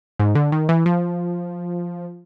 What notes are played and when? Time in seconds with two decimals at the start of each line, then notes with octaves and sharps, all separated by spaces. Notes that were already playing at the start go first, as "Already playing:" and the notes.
0.19 G#2
0.35 D3
0.52 D#3
0.69 E3
0.86 F3